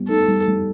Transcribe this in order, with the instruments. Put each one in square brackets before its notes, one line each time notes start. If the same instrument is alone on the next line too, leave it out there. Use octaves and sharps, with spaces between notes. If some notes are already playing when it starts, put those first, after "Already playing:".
Already playing: [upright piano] G3 B3
[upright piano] D#4 [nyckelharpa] A4
[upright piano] G3
G3